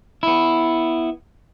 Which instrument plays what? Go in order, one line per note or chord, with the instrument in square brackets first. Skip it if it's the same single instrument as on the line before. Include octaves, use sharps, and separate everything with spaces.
[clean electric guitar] B3 E4